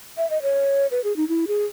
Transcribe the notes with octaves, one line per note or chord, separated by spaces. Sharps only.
E5
D#5
C#5
B4
G#4
D#4
E4
G#4